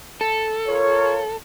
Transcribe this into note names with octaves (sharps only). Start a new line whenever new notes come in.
A4
F4 A#4 C#5